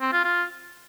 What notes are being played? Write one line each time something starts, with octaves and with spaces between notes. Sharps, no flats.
C4
F4
F4